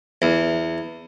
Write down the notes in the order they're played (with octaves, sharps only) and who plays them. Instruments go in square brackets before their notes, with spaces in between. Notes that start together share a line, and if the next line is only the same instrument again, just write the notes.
[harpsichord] E2